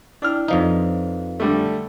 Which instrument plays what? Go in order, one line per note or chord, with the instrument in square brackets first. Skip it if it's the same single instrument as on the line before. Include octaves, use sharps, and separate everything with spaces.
[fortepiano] D4 F6 [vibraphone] E4 G5
[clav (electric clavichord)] F2 F3 D#4 [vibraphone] B4 F5
[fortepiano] D3 G3 A3